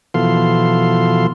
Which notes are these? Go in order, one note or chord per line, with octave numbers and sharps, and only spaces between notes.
B2 E3 F3 A4 F5 C6